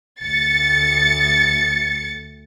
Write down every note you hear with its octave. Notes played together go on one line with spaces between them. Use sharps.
D2 A6 C#7